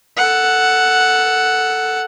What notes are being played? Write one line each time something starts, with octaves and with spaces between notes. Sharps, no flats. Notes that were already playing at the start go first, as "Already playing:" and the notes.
A4 F#5